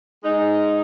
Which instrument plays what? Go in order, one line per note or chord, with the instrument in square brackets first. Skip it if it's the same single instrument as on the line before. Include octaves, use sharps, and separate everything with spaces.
[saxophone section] G#3 D#4